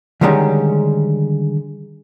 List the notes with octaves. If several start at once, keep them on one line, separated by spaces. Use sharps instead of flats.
D3 D#3 G3 G#3 C#4 A#5